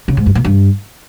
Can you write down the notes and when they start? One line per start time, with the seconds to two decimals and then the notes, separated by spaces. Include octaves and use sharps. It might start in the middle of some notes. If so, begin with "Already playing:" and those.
0.08 C#3
0.17 G#2
0.26 G2
0.35 A#2
0.44 G2